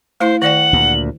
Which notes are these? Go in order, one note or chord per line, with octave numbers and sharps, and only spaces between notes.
A3 E4 C5
D#3 D5 F#5 G5 F#7
D2 A#2